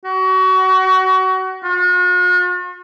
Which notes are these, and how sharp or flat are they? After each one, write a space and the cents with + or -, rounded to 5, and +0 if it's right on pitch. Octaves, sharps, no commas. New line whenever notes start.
F#4 +25
F#4 -45